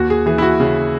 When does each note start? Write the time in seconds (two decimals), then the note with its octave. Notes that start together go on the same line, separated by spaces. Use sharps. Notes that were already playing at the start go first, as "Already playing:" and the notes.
Already playing: D#2 F#4
0.10 G#4
0.26 E3 G#4
0.38 E4
0.42 F#4
0.60 C#3